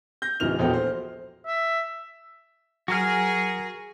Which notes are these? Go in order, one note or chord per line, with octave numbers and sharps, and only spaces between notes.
G6 A#6
D1 C#2 E3 F6 F7
E1 A#1 E2 F#4 A4 G5
C5
E5
F#3 F#4 G#4 A#4 F6